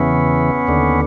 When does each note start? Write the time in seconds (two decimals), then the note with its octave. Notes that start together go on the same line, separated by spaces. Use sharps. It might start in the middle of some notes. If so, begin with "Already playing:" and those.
Already playing: E2 C#3 E3 B3 C#4
0.67 D#2 D3